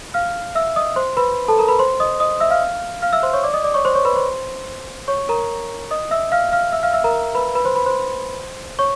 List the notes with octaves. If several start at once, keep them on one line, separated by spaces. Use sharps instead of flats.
F5 F6
E5 E6
D#5 D#6
C5 C6
B4 B5
A4 A5
A#4 A#5
B4 B5
C5 C6
D#5 D#6
D#5 D#6
E5 E6
F5 F6
F5 F6
E5 E6
C5 C6
C#5 C#6
D5 D6
D#5 D#6
D5 D6
C#5 C#6
C5 C6
C#5 C#6
B4 B5
C5 C6
C#5 C#6
A#4 A#5
D#5 D#6
E5 E6
F5 F6
F5 F6
E5 E6
F5 F6
E5 E6
A#4 A#5
B4 B5
B4 B5
C5 C6
B4 B5
C5 C6
C#5 C#6